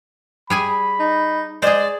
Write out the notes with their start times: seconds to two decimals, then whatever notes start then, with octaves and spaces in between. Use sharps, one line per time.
0.50 G3 G#4 G#5 B5
1.00 D#4
1.62 G#3 G#4 C5 D5